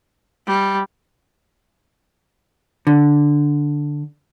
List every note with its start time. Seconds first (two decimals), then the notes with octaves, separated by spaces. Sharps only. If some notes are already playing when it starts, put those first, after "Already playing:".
0.47 G3
2.87 D3